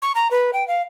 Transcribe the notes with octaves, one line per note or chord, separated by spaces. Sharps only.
C#6
A#5
B4
G5
F5